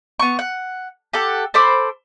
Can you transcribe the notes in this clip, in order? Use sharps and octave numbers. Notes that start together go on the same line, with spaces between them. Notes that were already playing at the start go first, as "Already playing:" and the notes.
B3 C#6
F#5
G4 A4 F#5
A4 C5 B5 D6